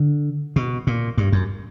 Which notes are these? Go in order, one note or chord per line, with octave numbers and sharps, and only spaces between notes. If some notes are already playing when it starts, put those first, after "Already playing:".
Already playing: D3
B2
A#2
G2
F#2